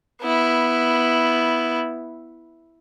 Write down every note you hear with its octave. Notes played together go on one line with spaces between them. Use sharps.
B3 E4